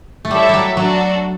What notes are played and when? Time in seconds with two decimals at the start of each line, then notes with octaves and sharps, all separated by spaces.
0.25 A3
0.31 G3 E4 A4 C#5 E5
0.49 F#3 G3
0.77 F#3 D4 F#4 A4